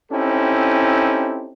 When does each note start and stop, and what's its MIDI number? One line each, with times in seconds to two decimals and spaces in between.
0.12 1.53 60
0.12 1.53 61
0.12 1.53 63
0.12 1.53 64
0.12 1.53 67
0.12 1.53 69